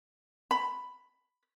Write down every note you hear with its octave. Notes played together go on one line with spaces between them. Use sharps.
B5